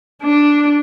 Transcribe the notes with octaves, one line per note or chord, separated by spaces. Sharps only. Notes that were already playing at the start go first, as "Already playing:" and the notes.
D4